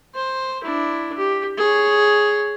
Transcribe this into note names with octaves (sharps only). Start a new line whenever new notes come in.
C5
D4 E4
G4
G#4 C#5